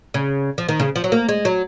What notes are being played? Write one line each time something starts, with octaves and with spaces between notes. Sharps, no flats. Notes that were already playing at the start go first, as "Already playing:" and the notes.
C#3
F3
D#3
C#3
F3
F#3
A#3
G#3
F#3